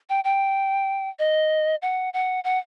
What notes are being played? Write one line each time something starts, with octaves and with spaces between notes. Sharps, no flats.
G5
G5
D#5
F#5
F#5
F#5